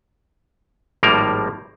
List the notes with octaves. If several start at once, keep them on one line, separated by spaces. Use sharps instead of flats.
G#1 A2 F3 G3 A#3 A#4